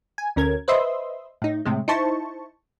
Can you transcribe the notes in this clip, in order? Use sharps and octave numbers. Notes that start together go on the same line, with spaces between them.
G#5
D2 C#4 A#4 G#6
B4 C5 D#5 E5 C6
A2 D#4
A2 C3 G#3
D#4 E4 C5 A5 C#6